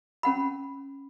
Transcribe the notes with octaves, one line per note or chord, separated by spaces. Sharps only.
C#4 F#5 B5